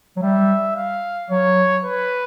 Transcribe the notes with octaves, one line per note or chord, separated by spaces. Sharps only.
F#3
G3 E5
F5
F#3 C#5
B4